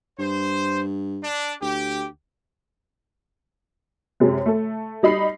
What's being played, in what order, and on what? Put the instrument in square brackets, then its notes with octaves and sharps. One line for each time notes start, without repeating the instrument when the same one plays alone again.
[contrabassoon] G2 [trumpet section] C5
[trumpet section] D4
[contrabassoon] D2 [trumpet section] G4
[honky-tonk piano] F#2 C3 G#3
A3 A4
G3 D#4 B5 C7